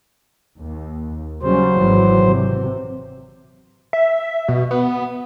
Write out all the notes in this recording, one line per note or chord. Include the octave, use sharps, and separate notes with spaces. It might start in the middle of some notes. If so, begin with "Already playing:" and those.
D#2
C#3 F#3 G3 C5
G#1 G#2 E3
C3
E5
B2
B3